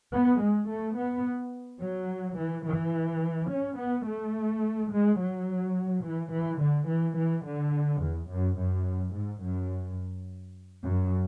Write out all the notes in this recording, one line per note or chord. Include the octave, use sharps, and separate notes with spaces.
B3
G#3
A3
B3
F#3
E3
E3
C#4
B3
A3
G#3
F#3
E3
E3
D3
E3
E3
D3
E2
F#2
F#2
G#2
F#2
F#2